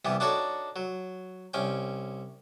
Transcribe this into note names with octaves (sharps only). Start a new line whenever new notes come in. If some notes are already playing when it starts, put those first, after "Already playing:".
C2 E3 G3 B3
D4 D#4 F#4 A4 C#5 D5
F#3
C2 C#4 G5